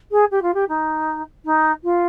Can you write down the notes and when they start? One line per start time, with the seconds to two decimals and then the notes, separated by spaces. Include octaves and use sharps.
0.11 G#4
0.31 G4
0.42 F4
0.54 G4
0.68 D#4
1.45 D#4
1.83 F4